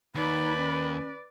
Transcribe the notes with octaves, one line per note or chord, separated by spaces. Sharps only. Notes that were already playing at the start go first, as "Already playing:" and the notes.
D#2 D#4 B4 D5 B5
C#4